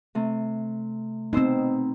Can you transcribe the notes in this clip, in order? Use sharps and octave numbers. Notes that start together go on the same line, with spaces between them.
C3 A3
B2 C4 D#4 C5 E6